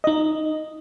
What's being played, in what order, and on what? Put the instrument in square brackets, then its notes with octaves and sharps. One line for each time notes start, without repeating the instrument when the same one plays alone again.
[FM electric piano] D#4 D#5